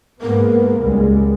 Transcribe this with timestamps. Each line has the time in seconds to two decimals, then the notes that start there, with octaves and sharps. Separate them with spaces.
0.22 G#2 A#3 B3 A#4
0.81 C#2 G3 G#3